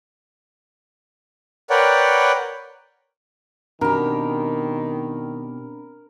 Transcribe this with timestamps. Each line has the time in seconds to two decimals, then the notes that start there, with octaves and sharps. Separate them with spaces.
1.70 A#4 B4 C#5 D5 F#5 G5
3.81 B2 D#3 C4 D4 G4 A#4 B5